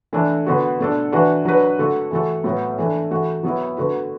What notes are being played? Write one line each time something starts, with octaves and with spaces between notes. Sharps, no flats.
E3 A3 D4 A4
D3 B3 F#4
B2 A3 D4 A4
E3 D4 F#4 B4
F#3 D4 B4
D3 A3 F#4 A4
E3 A3 F#4 A4
A2 F#3 B3
E3 A3 D4
E3 A3 F#4
F#3 B3 E4
D3 A3 F#4 B4